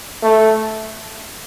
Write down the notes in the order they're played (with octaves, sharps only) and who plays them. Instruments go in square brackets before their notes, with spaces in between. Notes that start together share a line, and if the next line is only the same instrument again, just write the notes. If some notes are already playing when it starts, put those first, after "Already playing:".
[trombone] A3